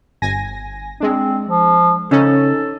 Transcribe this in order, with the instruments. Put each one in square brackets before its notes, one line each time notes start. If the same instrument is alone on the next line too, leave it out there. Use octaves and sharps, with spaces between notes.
[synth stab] G1 G#5 A#6
[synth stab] G#3 D4 [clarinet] C4
[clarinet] F3
[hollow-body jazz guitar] C#3 [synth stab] C#4 D#4 [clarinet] A4